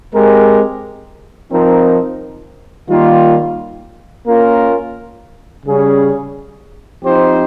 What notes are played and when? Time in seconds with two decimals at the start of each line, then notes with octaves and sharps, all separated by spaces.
0.14 G#3 C4 G4 A#4
1.51 F3 C4 D#4 A#4
2.89 D#3 G3 A#3 F4
4.27 A#3 C#4 F4 A#4
5.65 C#3 G3 C#4 G#4
7.03 F3 C4 D#4 G4 C5